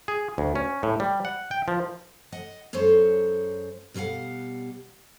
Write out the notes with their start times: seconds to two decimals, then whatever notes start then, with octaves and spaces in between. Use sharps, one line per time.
0.08 G#4
0.38 D2
0.55 C#4
0.83 A2
1.00 G3
1.25 F#5
1.51 G5
1.68 F3
2.32 D#5 F#5
2.73 F#2 G#3 A4 C5 C#5
3.94 B2 G3 A#4 F5 F#5